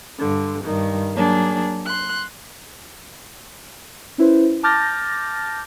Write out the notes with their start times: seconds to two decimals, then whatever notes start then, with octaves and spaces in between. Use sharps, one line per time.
0.18 G2 D3
0.64 G2 D#3
1.14 F#3 A#3 D4 G#4
1.85 C6 F#6
4.18 C#4 E4 B4 C5
4.63 A5 D6 F6 G6 A6 A#6